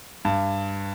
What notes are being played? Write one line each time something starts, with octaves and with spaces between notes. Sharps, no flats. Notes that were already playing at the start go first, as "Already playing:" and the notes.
G2